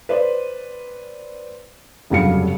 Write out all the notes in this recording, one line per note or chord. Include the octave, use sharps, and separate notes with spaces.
B4 C5 D5
F1 G2 C#3 F#3 F5 C#7